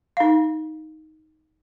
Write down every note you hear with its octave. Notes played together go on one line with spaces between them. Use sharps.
D#4 F5